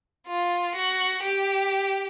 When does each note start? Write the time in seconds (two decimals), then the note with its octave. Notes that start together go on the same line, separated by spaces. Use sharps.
0.28 F4
0.76 F#4
1.23 G4